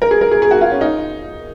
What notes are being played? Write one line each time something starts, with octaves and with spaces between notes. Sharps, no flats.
A#4
G#4
A#4
G#4
G#4
F#4
F4
C#4
D#4